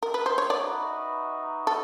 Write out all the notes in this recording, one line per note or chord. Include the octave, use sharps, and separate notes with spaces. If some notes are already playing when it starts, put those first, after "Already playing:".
A#4
B4
C5
C#5
D#4 F#4 B4 D5 E5
A4